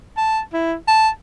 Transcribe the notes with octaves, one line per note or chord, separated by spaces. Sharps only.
A5
E4
A5